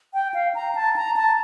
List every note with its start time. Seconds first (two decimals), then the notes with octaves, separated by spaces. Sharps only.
0.14 G5
0.34 F5
0.55 A#5
0.75 A5
0.96 A#5
1.16 A5